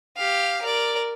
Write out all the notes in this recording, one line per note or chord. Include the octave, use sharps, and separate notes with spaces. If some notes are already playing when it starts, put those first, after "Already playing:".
G4 F5
A#4 D5